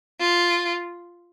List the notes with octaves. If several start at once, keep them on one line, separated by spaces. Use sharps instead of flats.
F4